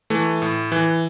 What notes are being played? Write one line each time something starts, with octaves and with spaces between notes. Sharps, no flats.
E3 A3
A2
E3